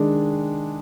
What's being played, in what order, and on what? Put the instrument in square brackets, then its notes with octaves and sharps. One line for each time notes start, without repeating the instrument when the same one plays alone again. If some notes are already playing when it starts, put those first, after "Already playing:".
Already playing: [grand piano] D#3 G#3 D4